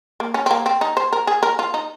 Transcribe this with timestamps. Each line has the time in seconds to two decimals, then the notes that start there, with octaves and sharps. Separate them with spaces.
0.20 A#3
0.34 C#4
0.46 C4
0.51 A#3
0.66 C4
0.81 D#4
0.97 C5
1.12 A#4
1.27 G#4
1.43 A#4
1.59 F4
1.74 D#4